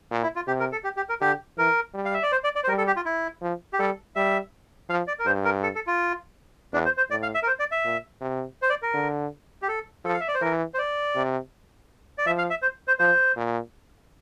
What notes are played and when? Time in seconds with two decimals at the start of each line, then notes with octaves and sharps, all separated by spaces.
0.11 A#2
0.23 E4
0.36 F4
0.47 C3 G4
0.60 A#4
0.72 A4
0.84 G4
0.97 G4
1.09 A#4
1.21 D3 G4
1.57 E3 A#4
1.94 G3
2.05 F5
2.14 E5
2.23 D5
2.32 C5
2.44 D5
2.56 D5
2.64 C5
2.68 G3 A#4
2.78 A4
2.87 G4
2.96 F4
3.05 E4
3.42 F3
3.73 G4
3.79 G3 A4
4.15 G3 E5
4.89 F3 F5
5.07 D5
5.19 A#4
5.26 G2 C5
5.45 A#4
5.63 A4
5.75 A4
5.87 F4
6.74 E2 D4
6.85 C5
6.97 C5
7.10 A2 D5
7.23 F5
7.35 E5
7.43 A#4
7.47 C5
7.59 D5
7.72 E5
7.85 A#2
8.21 C3
8.62 C5
8.70 D5
8.82 A#4
8.94 D3
9.62 G4
9.68 A4
10.05 F3 A4
10.14 F5
10.21 E5
10.28 D5
10.34 C5
10.41 E3 A#4
10.74 C5
10.79 D5
11.15 C3
12.18 D5
12.26 F3 E5
12.38 F5
12.50 E5
12.62 C5
12.88 C5
12.99 F3 C5
13.36 A#2